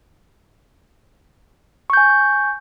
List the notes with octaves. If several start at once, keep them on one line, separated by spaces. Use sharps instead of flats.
G#5 C#6 G6